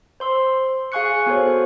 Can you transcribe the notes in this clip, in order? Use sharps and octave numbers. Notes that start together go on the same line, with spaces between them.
C5 C6 E6
G#4 F5 G#5 C#6 F#6 C#7
B3 F#4 A4 C5 C#5